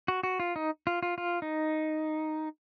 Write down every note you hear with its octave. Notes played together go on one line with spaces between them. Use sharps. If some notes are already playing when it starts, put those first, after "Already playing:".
F#4
F#4
F4
D#4
F4
F4
F4
D#4